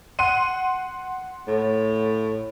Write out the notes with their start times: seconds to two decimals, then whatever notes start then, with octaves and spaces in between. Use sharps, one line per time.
0.19 F#5 C6 D#7
1.47 A2